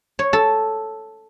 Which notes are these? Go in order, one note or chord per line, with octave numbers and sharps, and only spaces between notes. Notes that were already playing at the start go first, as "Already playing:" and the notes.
C#5
A4